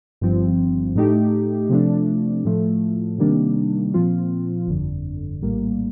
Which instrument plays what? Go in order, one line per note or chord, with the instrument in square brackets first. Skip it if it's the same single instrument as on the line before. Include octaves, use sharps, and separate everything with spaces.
[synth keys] G1 G2 F3 C4
A2 A3 D#4 G4
C3 F3 A3 D4
A2 F3 A3
C3 D#3 G3 A#3 D4
A#2 F3 C4 F4
G1 F2 D3
A#1 A2 G3 A#3